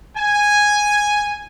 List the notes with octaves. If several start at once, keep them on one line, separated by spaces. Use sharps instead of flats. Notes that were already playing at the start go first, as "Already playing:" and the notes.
G#5